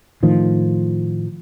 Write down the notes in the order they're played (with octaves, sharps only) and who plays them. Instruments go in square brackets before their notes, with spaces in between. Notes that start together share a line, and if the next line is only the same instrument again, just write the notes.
[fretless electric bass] A2 D#3 F3